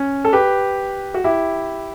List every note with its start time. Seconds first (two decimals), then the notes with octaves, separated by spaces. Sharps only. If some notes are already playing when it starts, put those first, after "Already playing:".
Already playing: C#4
0.25 A4
0.33 G4 B4
1.14 F#4
1.24 E4 G4